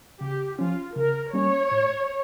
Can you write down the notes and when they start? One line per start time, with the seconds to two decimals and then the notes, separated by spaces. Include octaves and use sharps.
0.21 C#3 G4
0.58 F3 C#4 F4
0.96 C#3 A#4
1.33 G3 A#3 C#4 C#5
1.71 A2